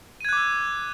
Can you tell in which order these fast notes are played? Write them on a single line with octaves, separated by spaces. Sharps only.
D#7 G#6 F#6 D6 E6